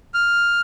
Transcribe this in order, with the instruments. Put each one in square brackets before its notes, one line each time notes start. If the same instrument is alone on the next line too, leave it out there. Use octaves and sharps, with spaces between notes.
[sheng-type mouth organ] F6